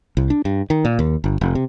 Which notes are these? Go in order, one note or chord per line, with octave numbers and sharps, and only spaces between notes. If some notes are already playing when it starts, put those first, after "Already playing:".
C2
D4
G2
D#3
A#2
D#2
G1
F1
C3